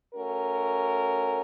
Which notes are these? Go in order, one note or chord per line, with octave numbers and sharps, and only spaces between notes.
A3 C#4 F#4 A#4